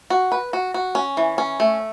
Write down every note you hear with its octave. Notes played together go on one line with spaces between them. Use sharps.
F#4
B4
F#4
F#4
C#4
E3
C#4
A3